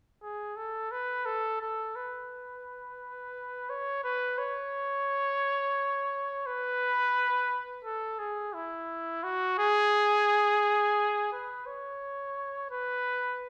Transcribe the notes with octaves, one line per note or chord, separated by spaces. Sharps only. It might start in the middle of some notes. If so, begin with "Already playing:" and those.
G#4
A4
B4
A4
A4
B4
C#5
B4
C#5
B4
A4
G#4
E4
F#4
G#4
B4
C#5
B4